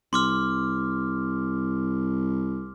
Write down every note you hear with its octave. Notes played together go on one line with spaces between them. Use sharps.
C2 C6 D6 F6